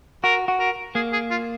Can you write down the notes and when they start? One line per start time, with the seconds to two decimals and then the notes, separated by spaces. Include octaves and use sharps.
0.24 F#4 A#4
0.48 F#4
0.59 A#4
0.95 A#3 G#4
1.12 G#4
1.30 F4